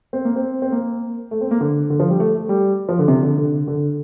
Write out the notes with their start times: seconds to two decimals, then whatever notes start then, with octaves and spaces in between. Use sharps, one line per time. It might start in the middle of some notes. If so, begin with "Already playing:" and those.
0.13 C4
0.25 A#3
0.36 C4
0.62 C4
0.72 A#3
1.31 A3
1.41 C4
1.51 A#3
1.61 D3
1.90 D3
2.00 F3
2.10 G3
2.20 A3
2.35 A3
2.49 G3
2.89 F3
2.99 D3
3.08 C3
3.23 D3
3.38 D3
3.68 D3